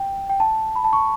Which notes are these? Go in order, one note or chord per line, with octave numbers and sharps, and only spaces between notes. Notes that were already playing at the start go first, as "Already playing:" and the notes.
Already playing: G5
G5
A5
B5
A5
C#6